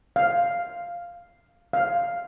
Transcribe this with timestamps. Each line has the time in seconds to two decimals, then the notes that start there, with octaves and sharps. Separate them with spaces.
0.16 F5
1.73 F5